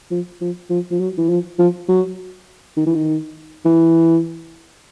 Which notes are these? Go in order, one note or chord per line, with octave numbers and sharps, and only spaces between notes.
F3
F3
F3
F3
F#3
E3
F3
F3
F#3
D#3
E3
D#3
E3